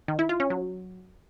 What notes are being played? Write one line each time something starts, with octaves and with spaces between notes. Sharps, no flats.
D#3
E4
F4
C#4
F#3